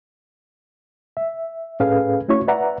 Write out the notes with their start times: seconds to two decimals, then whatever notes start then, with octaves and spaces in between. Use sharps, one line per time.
1.17 E5
1.80 A2 C#4 G#4 A4 B4 F5
2.28 A3 C#4 E4 F#4 C#5 C#6
2.48 B4 D5 E5 F#5 A#5